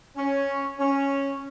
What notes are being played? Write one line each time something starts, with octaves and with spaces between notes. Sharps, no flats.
C#4
C#4